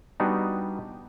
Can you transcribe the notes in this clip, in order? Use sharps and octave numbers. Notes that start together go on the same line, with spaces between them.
G3 B3 D4 D#4 F#4